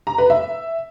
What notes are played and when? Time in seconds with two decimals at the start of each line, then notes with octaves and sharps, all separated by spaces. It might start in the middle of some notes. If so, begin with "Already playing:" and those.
0.07 A#5
0.18 B4
0.30 E5